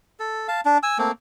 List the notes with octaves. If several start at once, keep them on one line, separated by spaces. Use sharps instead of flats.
A4
F5 A5
D4
G#5 E6
A3 A#3 C4